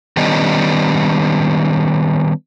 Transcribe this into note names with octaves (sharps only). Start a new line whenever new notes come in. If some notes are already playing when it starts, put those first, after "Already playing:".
D#3 G3 B3 C#4 D4 D#5